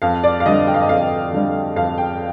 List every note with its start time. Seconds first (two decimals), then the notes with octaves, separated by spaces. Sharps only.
0.02 F2 F5
0.24 D5
0.40 F5
0.46 D3 G3 D#5
0.67 G5
0.74 F5
0.82 D#5
0.89 F2 F5
1.33 D3 G3
1.76 F2 F5
1.98 G5